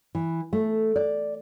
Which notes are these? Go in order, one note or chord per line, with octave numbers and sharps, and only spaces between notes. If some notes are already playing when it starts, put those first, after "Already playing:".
E3
A3
D5